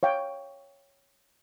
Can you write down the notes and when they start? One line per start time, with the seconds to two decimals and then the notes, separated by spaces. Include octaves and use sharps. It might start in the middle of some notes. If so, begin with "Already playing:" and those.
0.03 C#5 F5 G5